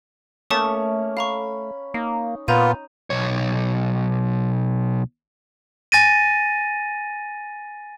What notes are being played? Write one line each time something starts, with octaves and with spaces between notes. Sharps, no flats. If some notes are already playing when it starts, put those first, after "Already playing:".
A3 A#3 C#4 C#5 A5 C#6 D#6
F5 A#5 B5 C#6
A#3 D#4
A#2 B3 F4 A#5 G6 D#7
B1 C#5
G#5 A6 A#6 D#7